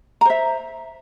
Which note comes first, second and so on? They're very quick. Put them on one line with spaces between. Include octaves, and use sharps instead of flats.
A#5 C5 E5